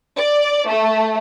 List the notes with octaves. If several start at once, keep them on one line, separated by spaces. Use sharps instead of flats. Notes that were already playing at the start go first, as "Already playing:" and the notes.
D5
A3